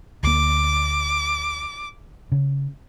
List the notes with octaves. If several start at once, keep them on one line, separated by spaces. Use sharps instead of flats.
D2 A#3 D6
C#3